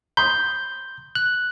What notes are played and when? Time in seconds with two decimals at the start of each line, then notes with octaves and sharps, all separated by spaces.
0.17 B5 C6 D#6 G6
1.15 F#6